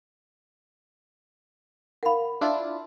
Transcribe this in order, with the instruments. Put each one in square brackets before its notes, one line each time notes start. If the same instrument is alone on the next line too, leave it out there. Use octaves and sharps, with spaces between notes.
[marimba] A#4 F5 [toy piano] F#5 B5
[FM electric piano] D4 E4 F4